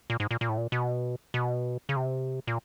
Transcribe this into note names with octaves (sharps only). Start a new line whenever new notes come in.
A#2
G#2
A#2
A#2
A2
A#2
B2
B2
C#3
C3
A#2